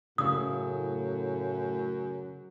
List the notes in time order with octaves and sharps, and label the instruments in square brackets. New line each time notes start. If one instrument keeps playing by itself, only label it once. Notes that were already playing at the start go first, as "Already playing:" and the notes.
[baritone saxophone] F#2 [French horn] A2 [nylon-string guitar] C#3 F5 [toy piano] D#6